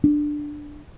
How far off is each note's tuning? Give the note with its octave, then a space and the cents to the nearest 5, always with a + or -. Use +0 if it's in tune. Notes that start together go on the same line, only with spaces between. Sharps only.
D4 +10